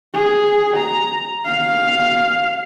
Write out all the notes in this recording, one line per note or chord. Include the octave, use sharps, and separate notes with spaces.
G#4
A#5
F5